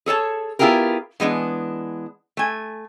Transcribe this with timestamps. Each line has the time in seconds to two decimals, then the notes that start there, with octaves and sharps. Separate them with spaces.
0.06 G#4 A4 C#5 A5
0.59 B3 E4 F4 G4 G#4 A#4
1.20 E3 G#3 B3 D4
2.37 A3 G#5